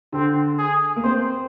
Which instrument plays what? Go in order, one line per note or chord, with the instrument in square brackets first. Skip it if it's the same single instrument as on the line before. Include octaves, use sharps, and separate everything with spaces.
[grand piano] D3 [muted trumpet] C4
[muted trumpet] G#4
[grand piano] A#3
[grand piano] C4 [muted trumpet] C5